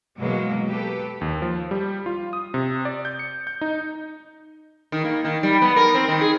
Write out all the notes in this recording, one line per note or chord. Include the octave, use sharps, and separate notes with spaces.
B2 E3 F#3 G#3 A#3
G4 A4 B4
D#2
F3
G3
F4
D#6
C3
D5
G6
C#7
G6
D#4
D#3
A#3
D#3
G3
B3
A#4
C4
D#3
G#4